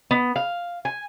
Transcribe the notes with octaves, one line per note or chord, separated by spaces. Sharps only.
B3
F5
G#5